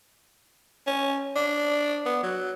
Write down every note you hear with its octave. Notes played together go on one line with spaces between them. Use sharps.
C#4
D4
B3
F#3